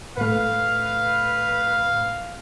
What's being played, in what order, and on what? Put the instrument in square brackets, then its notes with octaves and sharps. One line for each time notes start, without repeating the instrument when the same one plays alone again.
[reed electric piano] A2 A3 [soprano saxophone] B4 [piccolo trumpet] F5